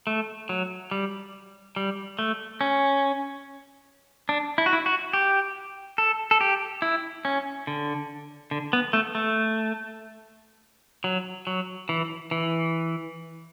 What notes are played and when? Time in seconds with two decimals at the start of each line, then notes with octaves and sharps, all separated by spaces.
0.07 A3
0.49 F#3
0.91 G3
1.76 G3
2.19 A3
2.61 C#4
4.29 D4
4.58 E4
4.66 F#4
4.73 E4
4.86 F#4
5.13 G4
5.98 A4
6.31 A4
6.41 G4
6.82 E4
7.25 C#4
7.67 D3
8.51 D3
8.73 B3
8.93 A3
9.15 A3
11.04 F#3
11.47 F#3
11.89 E3
12.31 E3